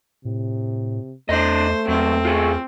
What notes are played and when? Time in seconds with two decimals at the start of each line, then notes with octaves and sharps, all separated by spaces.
0.25 A2 C3
1.29 E2 A3 D4 C5 D#5
1.88 E2 A#2 F#3 C4
2.25 F4 G#4 C#5